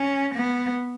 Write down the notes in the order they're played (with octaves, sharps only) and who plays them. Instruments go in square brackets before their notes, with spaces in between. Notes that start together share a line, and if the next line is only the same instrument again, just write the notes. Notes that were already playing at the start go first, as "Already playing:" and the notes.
Already playing: [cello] C#4
B3